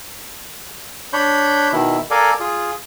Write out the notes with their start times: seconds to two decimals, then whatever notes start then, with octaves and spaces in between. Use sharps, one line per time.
1.13 D4 C#5 B5 G6
1.72 B2 D#3 E4
2.11 A4 A#4 D5 F5 G#5
2.40 F4 G#4